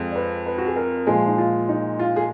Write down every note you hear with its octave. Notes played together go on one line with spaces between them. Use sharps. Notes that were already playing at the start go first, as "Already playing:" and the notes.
Already playing: F2 G#3
D5
B4
B4
F#4
G#4
A#4
A#2 F3 G#3 G#4
D#4
F4
D#4
F4
G#4